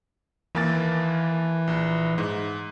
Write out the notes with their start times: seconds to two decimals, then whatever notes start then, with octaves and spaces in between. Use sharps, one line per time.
0.55 D#2 E3 A#3 A6
1.67 A#1
2.18 G#2